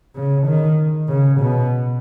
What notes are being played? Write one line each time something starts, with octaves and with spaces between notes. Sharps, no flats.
C#3
D#3
C#3
B2